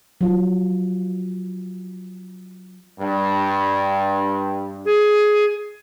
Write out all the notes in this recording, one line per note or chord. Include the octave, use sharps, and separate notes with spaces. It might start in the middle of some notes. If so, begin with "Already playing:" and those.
F#3 F4
G2
G#4